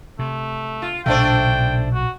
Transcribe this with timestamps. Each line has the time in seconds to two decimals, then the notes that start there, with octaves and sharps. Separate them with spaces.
0.19 C3 A3
0.82 F4
1.06 B1 A#2 C#3 A3 D4 C5 G5
1.94 F#4